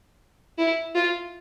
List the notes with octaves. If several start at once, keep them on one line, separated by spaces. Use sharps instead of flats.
E4
F4